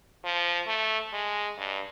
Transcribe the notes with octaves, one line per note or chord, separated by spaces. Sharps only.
F3
A3
G#3
G2